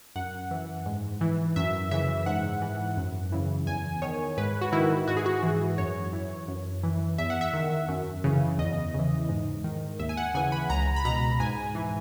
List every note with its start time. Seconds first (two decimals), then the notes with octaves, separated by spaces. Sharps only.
0.16 F#2 F#5
0.51 E3
0.86 G#2
1.21 E3
1.56 F#2 E5
1.91 C#3 E3 E5
2.26 G#2 F#5
2.62 E3
2.97 F#2
3.32 C#3 E3
3.67 E2 G#5
4.02 D#3 C#5
4.37 G#2 B4
4.61 F#4
4.72 D#3 E4
5.07 G#2 F#4
5.17 G#4
5.26 F#4
5.43 E3
5.78 F#2 C#5
6.13 E3
6.48 F#2
6.83 E3
7.18 E2 E5
7.30 F#5
7.41 E5
7.53 D#3
7.88 F#2
8.24 C#3 E3
8.59 E2 D#5
8.94 C#3 E3
9.29 G#2
9.64 D#3
9.99 D#2 E5
10.09 G#5
10.17 F#5
10.34 C#3 E3 G#5
10.52 B5
10.70 C#2 A#5
10.96 B5
11.05 B2 A#5
11.40 G#2 G#5
11.75 E3